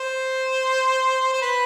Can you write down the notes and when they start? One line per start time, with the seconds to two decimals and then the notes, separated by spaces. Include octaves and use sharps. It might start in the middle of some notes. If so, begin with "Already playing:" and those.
Already playing: C5
1.34 C5
1.42 B4